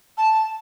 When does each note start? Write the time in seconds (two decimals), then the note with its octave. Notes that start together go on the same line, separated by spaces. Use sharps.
0.18 A5